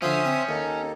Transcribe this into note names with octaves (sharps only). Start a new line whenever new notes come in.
D3 F3 C#4 C5 E5 D#6
C4
D#2 A#3 D#4 A4